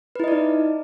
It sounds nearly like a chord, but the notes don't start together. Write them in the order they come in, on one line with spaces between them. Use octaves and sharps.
B4 E4 D#5 D5 D#4